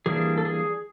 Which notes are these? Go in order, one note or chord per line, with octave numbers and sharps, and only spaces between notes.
E3 G3 A#3 D4 G#4
A4
G#4